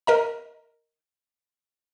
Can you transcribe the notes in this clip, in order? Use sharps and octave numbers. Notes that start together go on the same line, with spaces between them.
A#4 D#5 A#5